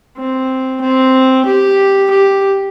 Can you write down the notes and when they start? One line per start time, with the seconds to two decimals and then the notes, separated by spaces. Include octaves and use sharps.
0.17 C4
0.81 C4
1.46 G4
2.10 G4